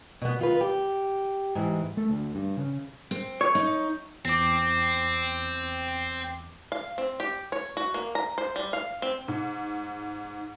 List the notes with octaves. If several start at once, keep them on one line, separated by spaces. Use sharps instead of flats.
B2 B3
D#3 F4 B4
G4
G#2 E3
A3
D2
G2
C#3
C4
C#5
D#4
E2 C4 D6
F5
C4
G4
C#5
F#4
A#3
A#5
C5
G3
F5
C4
G#2